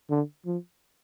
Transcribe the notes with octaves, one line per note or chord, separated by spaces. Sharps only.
D3
F3